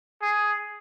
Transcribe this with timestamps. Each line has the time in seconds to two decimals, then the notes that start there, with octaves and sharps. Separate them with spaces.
0.22 G#4